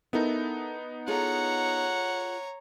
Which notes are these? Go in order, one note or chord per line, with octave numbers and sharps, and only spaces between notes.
B3 D#4 E4 A4 A#4
F4 G#4 A4 C#5 F#5 A#5